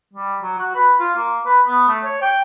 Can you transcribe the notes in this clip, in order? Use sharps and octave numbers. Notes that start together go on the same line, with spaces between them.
G3
F#3
F#4
B4
F4
A#3
B4
B3
A3
C#5
G5